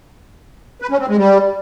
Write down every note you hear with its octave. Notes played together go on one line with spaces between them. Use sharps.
B4
C#4
C4
G#3
G3